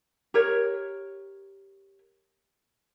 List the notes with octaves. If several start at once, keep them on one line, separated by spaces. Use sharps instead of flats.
G4 A#4 C#5